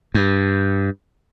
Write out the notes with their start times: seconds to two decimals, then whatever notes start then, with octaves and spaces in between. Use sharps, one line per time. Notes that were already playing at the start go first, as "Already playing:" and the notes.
0.14 G2